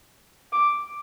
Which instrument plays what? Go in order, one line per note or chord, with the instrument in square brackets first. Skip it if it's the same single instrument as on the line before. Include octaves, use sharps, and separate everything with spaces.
[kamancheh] D6